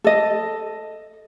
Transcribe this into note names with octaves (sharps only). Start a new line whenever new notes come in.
A4 D#5